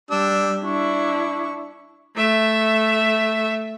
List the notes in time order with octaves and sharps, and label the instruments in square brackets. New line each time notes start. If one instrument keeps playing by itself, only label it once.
[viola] G3 [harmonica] D4 E6
[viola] D4 E4 [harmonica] C#6
[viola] A3 E5